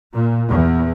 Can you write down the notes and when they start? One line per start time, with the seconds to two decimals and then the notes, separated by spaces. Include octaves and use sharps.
0.14 A#2
0.49 E2